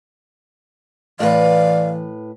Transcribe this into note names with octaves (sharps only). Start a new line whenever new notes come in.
A2 E3 B4 D5 F5